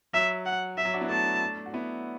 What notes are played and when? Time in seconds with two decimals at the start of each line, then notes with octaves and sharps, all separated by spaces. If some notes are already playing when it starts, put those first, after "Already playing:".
0.14 F#3 E5
0.46 F#5
0.78 E5
0.85 F#3
0.94 D4 F#4
1.01 B3 E4
1.09 A3 D4 A5
1.66 F#4
1.74 B3 E4